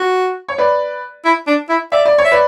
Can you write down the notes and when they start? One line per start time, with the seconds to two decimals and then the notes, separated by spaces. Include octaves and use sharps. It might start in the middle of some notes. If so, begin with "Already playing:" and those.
Already playing: F#4
0.48 C#5
0.58 B4 D5
1.25 E4
1.47 D4
1.69 E4
1.92 D5 E5
2.05 D5
2.18 C#5
2.25 E5
2.32 B4 D5